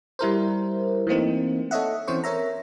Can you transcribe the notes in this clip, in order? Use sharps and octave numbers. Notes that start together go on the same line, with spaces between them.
G3 E4 A#4 C5
E3 A3 A#3 C4 D#4
A4 C#5 D#5 E5 F#5
E3 C4 C#4 C5 C#6
A#4 C#5 E5 A#5